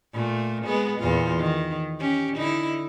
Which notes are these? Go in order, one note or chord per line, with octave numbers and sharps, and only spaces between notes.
A#2 A3
G#3 B3 G#4
E2 A#2 F4
D#3
C#4 G4
D3 D#4 E4